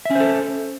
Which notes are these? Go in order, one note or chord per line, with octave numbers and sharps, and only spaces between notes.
C#4 A4 C5 E5